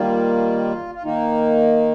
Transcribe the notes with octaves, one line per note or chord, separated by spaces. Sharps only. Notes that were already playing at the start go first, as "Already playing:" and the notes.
Already playing: D#3 G3 A#3 F4
F4
D#3 A#3 D#4